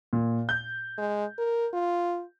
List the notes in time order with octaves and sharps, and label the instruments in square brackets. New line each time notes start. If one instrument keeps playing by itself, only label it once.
[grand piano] A#2
G6
[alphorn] G#3
A#4
F4